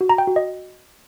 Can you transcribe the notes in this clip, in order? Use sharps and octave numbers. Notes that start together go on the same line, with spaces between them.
F#4
A#5
G5
F#4
D#5